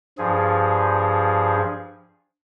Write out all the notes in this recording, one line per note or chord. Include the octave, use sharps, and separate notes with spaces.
G2 F3 G#4